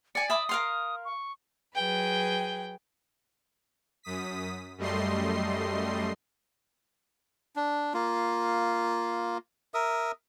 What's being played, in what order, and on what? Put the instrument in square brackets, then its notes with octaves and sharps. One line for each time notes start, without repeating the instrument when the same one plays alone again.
[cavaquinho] D5 G#5 [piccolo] C#7
[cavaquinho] E5 B5 D6 [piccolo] D#6
[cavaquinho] A#4 F5 C6
[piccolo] C#6
[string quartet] F#3 G#4 B4 [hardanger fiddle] G5
[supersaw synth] F#2 D#6 B6
F#2 G3 A3 D#5 C6 C7
[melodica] D4
A#3 F4
A#4 E5 D#6